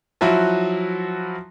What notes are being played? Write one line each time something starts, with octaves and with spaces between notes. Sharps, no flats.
F3 F#3 E4 F#4